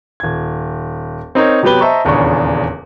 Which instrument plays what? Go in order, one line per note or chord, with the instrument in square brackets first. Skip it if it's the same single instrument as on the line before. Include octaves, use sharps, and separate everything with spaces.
[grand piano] D#1 G#6
C4 D#4 A#4 C#5
C3 F#3 B3 G4 B4 G7
C5 D#5 E5 A5 A#5 C#6
D#1 E2 C#3 D4 C#6